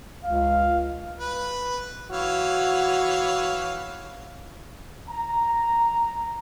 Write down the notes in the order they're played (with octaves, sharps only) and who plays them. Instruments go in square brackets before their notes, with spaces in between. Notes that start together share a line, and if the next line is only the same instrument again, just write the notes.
[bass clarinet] C#2 [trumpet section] F5
[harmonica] B4
[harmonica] E3 C#5 F5 [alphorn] F#4
[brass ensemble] A#5